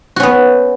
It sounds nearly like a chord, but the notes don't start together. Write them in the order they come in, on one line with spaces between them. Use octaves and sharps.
F#4 C#4 B3